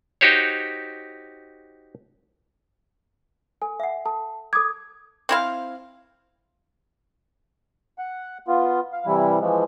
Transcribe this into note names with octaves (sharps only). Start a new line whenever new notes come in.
D#4 F#4 G4 C5 C#5
A4 G#5
E5 F#5
A4 A5
A4 D6 D#6 G#6
C4 E4 F5
F#5
B3 F4
F5
C3 E3 G3 E4
E3 F3 G#3